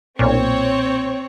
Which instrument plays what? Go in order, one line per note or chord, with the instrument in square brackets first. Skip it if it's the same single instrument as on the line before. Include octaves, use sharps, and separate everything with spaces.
[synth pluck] B1 A#2 [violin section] C4 C#5